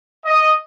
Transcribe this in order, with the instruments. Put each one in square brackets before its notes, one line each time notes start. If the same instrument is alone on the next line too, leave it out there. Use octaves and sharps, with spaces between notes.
[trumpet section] D#5